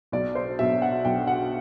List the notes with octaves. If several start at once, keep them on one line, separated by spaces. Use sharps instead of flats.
B1 D5
C5
B2 F#3 E5
F#5
B1 G5
F#5